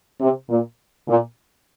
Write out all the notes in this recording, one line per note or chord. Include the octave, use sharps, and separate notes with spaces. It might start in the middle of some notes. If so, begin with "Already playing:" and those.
C3
A#2
A#2